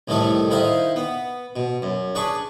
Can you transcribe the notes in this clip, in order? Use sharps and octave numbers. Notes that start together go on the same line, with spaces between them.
C2 A2 D#3 A3 D#4 A4
D#3 D#4 E4 C5 D#5 F5
B3
B2
F#2
D4 G#4 B4 A5 C#6